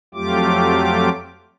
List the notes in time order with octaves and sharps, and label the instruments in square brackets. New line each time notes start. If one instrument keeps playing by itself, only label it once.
[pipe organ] F2 F#3 A3 F4 G4 D6